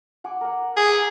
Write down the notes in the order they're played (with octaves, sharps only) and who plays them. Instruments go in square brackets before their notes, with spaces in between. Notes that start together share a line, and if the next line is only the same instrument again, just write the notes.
[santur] F#5 G#5 D6
A#4 F#5
[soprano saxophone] G#4